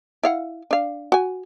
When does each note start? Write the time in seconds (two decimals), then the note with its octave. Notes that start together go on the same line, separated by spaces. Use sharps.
0.23 E4 F5 F#5
0.71 D4 F5
1.12 F#4 G#5